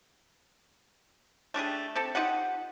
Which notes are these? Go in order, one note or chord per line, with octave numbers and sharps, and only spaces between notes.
A3 D4 G4 G#4
C4 G4 A4
D#4 F4 G4 F#5